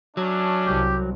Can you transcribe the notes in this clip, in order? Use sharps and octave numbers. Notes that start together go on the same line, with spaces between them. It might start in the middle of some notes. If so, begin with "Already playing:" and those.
F#3 A3 C#4 D4
C2 G4